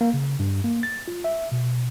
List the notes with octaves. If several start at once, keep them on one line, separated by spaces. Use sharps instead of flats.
A#3
C#3
G2
A#3
A6
F4
E5
B2